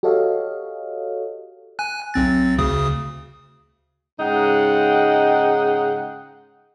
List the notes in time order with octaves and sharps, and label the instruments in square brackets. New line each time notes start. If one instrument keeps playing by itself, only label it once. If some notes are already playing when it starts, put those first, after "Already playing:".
[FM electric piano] F#4 G4 A4 C#5 D#5 F5
[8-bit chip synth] G#5 F#6
B1 C4 A6
D2 C#3 D#6
[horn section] G#2 C#3 G#3 D#4 F#5 G5